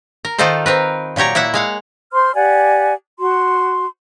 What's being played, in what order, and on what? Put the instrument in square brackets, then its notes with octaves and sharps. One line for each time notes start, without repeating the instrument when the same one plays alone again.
[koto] A#4
D#3 D#4 F4 A4 C5
C4 A#4 B4
A#2 F#3 G4 C#5 A#5
A#3 E4 E5 F#5
G#3 F5 F#5
[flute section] C5 C6 F6
G4 D5 F#5 G#5
F#4 C6